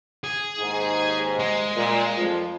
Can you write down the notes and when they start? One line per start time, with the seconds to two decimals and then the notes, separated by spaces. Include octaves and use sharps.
0.24 G#4
0.59 D#2 G#2
1.39 G#3
1.75 A#2
2.16 F2 F3